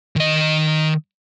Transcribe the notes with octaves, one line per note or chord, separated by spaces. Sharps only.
D#3 D#5